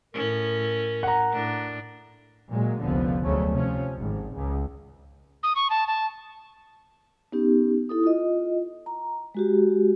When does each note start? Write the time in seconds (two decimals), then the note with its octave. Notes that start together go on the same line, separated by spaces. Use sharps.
0.14 A2 C#4 A#4
1.03 F#5 A#5
1.32 A2 D4
2.50 A#2 F#3 G#3
2.83 F1 C#2 D3 F3 B3
3.23 D2 C#3 F#3 A3 C#4
3.53 C3 F3 C#4
3.98 G#1
4.35 C#2
5.43 D#6
5.56 C#6
5.70 A5
5.87 A5
7.32 B3 C#4 D#4 G4
7.89 E4 A4 D#6
8.04 F4 D#5
8.86 A#5
9.35 G#3 F#4 G4